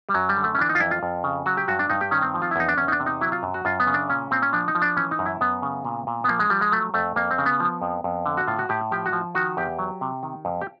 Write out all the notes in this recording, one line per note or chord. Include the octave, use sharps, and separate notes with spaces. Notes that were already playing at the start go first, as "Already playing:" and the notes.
G3
F#2 F#3
G3
D3
A3
C#4
E3 D4
D#4
F4
F2 E4
F4
F2
C#3
F#3 F#4
G4
G2 F#4
D4
G2 D#4
G4
D#3 C#4
C4
F3
F4
E4
E2 D#4
D4
E2 C#4
D#4
D4
C3
D#4
F#3 E4
F4
F#2
F#4
F#2 F4
B3
C#3
D4
A#2 C#4
A#2 C4
C#4
F3 D4
D#4
F3
D4
E3 C#4
D#4
F#2
E4
F#2 B3
C#3
A#2
A#2
B3
F3 A#3
G#3
F3 G3
G#3
F#3 A3
F2 A3
F2 A#3
C4
C#3
B3
F3
F2
F2
D3
F#4
A2 F4
F#4
A2 G4
F3 G4
F#4
F3
D#3 F#4
E2 G4
F#3
C3
D#3
F2
G4